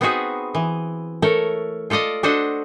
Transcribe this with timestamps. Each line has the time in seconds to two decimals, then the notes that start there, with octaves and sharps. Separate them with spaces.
0.01 B3 C4 D#4 F#4 G#4 B4
0.55 E3
1.22 A3 A4 A#4 C#5
1.90 F4 A4 D5 D#5 F5
2.23 D4 F#4 A4 C5 D#5 F#5